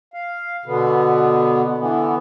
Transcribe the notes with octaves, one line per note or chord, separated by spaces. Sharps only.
F5
B2 D3 B3
D3 E3 B3